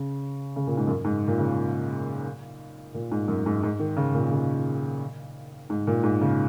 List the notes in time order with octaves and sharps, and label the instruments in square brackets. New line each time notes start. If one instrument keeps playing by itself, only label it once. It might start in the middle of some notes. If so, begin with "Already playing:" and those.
Already playing: [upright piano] C#3
C#3
A#2
G#2
F#2
G#2
A#2
C#3
A#2
G#2
F#2
G#2
G#2
D#3
C#3
A#2
C#3
G#2
A#2
G#2
C#3